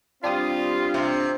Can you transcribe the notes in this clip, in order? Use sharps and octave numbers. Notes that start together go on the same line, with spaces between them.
G3 C4 D4 F4 G4 D#6
C3